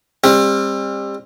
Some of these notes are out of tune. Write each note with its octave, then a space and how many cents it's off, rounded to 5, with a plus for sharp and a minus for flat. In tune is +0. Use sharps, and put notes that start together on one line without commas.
G3 +35 C4 +30